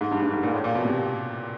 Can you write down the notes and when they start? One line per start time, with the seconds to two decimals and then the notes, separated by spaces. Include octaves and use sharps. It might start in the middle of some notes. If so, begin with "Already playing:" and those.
0.01 G#2
0.11 G2
0.22 G2
0.33 G#2
0.43 A#2
0.54 A2
0.64 A#2
0.75 B2
0.85 C3